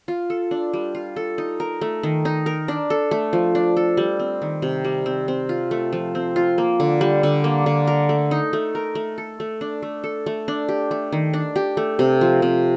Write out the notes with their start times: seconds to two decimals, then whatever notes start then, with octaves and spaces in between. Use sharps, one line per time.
0.08 F4
0.30 A4
0.51 D4
0.73 G3
0.95 F4
1.16 A4
1.38 D#4
1.60 A#4
1.81 A3
2.03 D#3
2.25 D#4
2.46 A#4
2.68 D4
2.90 A4
3.11 A3
3.33 F3
3.55 D4
3.77 A4
3.97 G3
4.19 C4
4.42 D#3
4.62 C3
4.84 G3
5.06 C4
5.28 C4
5.49 F4
5.71 A3
5.93 F3
6.15 C4
6.36 F4
6.58 A#3
6.80 D3
7.01 G3
7.23 D3
7.44 A#3
7.66 D3
7.87 A#4
8.09 A3
8.31 D#4
8.53 A3
8.75 A#4
8.95 A3
9.18 A4
9.40 A3
9.61 D4
9.82 A3
10.04 A4
10.26 A3
10.48 D4
10.69 G4
10.91 A3
11.12 D#3
11.33 D4
11.56 G4
11.77 A3
11.99 C3
12.21 F3
12.42 C3